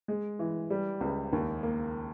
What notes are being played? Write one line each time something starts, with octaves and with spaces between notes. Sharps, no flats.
G#3
E3
G3
C#2
D#2
A#3